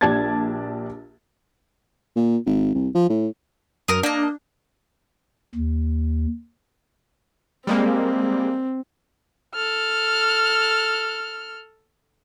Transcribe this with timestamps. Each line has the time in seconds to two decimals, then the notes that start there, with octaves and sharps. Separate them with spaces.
0.01 A#1 D4 G4 A5 G#6 A6
2.16 A#2
2.46 G#1
2.75 C2
2.95 F3
3.09 A2
3.88 F#2 A#4 D#6
4.03 A#3 D4 D#5
5.55 D#2
7.67 G3 G#3 A#3 C4
9.54 A4 F6